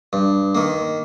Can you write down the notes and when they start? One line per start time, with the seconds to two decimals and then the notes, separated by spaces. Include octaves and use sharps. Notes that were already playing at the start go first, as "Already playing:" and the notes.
0.13 G2
0.55 D#3 A#3